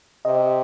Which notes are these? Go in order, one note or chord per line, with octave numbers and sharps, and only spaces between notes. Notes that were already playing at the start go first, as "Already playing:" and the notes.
C3 D#5